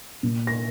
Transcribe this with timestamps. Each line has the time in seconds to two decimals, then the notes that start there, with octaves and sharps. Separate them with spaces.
0.23 A#2
0.47 A#6